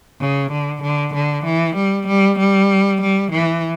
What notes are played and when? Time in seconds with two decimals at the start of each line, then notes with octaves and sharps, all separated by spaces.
0.20 C#3
0.52 D3
0.83 D3
1.14 D3
1.45 E3
1.76 G3
2.07 G3
2.39 G3
3.01 G3
3.32 E3